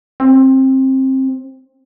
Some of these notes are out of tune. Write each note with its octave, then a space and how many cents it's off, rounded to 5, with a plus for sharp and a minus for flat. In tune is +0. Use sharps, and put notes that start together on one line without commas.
C4 +20